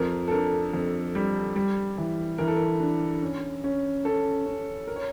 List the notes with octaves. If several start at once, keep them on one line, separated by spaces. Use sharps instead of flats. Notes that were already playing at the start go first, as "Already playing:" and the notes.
Already playing: F2 A#4
A4
D4 A#4
F2
G3
G3
E3
E3 A#4
A4
A#4
D4
C#4
C#4
C#4 A4
C#4
A#4
C#5